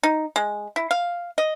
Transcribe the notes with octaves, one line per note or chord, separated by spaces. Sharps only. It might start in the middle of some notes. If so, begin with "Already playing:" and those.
D#4
G#3
E4
F5
D#5